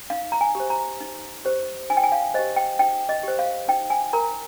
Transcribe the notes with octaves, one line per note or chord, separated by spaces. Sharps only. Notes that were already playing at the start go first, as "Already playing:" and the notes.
D#4 F5
A#5
G#5
G4 C5
A#5
D#4
G4 C5
D#4 G#5
G5
G#5
F5
G4 C5 D#5
G5
D#4 G5
D#5
G4 C5
F5
D#4 G5
G#5
A#4 A#5